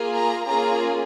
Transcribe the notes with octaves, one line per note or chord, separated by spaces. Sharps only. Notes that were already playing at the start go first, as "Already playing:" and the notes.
Already playing: A#3 F4 G#4
A#5
A#3 C#4 F4 G#4 A#5